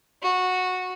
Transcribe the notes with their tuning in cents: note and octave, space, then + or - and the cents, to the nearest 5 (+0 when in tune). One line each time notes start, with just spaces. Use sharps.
F#4 -10